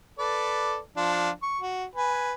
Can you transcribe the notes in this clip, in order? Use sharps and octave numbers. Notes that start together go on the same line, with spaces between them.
A4 B4 D5
F3 D4 F4
C#6
F#4
B4 G#5